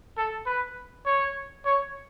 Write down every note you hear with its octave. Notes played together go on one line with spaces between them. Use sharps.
A4
B4
C#5
C#5